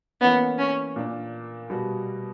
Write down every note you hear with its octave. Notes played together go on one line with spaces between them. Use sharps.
E3 A#3 B3 C#4
C#4
A#2 A#3 D4
B2 G3 B3 F#4